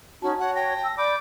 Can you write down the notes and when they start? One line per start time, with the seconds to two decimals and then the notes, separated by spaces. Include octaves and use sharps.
0.22 C#4 D#4 F#4 A5
0.39 F#4 C#5 F#5
0.55 G5 A#6
0.83 E6
0.97 D5 B5 D6 G6